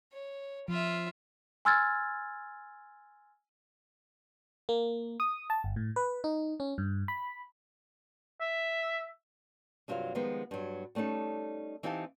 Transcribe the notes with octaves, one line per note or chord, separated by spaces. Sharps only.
C#5
F3 F4 E5
G#5 C6 E6 F6 G#6 A6
A#3
D#6
A5
G1
A2
B4
D#4
C#4
G2
B5
E5
G2 C3 F#3 F4 B4 F5
D#3 F3 G3 G#3 B3 F4
G2 F#3
G3 A3 C#4 D#4 A4
E3 C4 D#4 G4 F5 A5